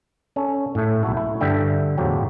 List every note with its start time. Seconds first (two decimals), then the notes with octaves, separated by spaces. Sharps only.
0.36 C#4 A4
0.75 A2 A3
1.03 B1 A3 F#4 A4
1.17 E4
1.41 G2 D3 E5 G5
1.97 E2 A2 F3 F#3 G4